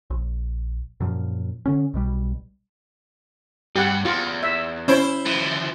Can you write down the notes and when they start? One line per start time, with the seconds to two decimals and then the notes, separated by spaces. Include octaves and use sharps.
0.10 A#1
1.00 F#2 A#2 F3
1.66 D3 C#4
1.94 B1 B2 G3
3.76 G2 G4 F#5
4.05 E2 F4
4.43 E5
4.88 C#4 E4 C5
5.25 E3 F3